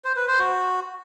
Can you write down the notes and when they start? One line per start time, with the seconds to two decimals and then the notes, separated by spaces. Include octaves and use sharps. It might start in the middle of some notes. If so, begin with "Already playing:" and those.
0.05 C5
0.16 B4
0.28 C5
0.39 F#4